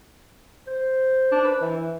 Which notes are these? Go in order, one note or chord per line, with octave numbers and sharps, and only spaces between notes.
C5
D4
B4
E3